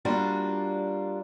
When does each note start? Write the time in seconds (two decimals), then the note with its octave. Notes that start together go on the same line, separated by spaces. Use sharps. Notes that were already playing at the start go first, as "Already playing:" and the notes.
0.05 G3 A#3 D4 F4 F#4